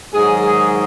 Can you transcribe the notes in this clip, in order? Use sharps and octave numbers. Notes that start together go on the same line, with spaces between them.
G#2 D#3 F#3 G#4
G#4